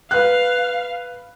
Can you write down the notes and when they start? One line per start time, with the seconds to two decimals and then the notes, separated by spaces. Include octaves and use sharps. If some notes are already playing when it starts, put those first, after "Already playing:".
0.11 B4 F5 F#6